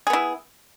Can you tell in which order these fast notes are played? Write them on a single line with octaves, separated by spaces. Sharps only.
G#4 B3 E4